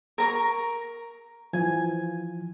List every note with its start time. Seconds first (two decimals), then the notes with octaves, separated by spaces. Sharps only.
0.18 A#4 A#5 C#6
1.53 E3 F3 G#5